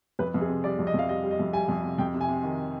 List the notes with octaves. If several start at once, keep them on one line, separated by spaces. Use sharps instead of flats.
F2 B4
F2
G#4
C3
G3 D5
F2
D#5
F2 F5
G3 D#5
G3
D#5
F2
G3 G#5
F2
C3
F2 G5
C3
G#5
C3
D#3